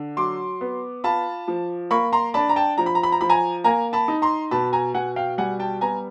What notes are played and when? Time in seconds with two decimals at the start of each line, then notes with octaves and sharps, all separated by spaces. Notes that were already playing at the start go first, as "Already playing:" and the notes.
Already playing: D3
0.17 F#3 C6 D6
0.61 B3
1.04 F4 A5 B5
1.48 F3
1.91 A#3 B5 C#6
2.13 A#5 C6
2.34 D4 A5 B5
2.49 A#5
2.56 G5 A5
2.78 F3 A#5
2.86 B5
2.95 A#5
3.03 B5
3.12 A#5
3.21 F3 B5
3.29 G#5 A#5
3.64 A#3 G#5 A#5
3.93 A5 B5
4.08 D#4
4.22 A#5 C6
4.51 B2 A5 B5
4.73 G#5 A#5
4.94 B2 F#5 G#5
5.16 F5 G5
5.38 G3 F#5 G#5
5.60 G5 A5
5.81 B3 G#5 A#5